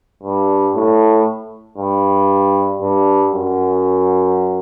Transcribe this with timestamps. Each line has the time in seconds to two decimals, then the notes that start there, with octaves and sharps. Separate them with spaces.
0.23 G2
0.75 A2
1.78 G2
2.81 G2
3.33 F#2